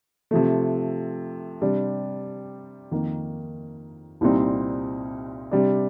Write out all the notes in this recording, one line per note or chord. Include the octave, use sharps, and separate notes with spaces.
C3 F3 A3
C3 G3 D4
F2 D#3 A#3
C2 A#2 G3 C4 D#4
C3 G3 D4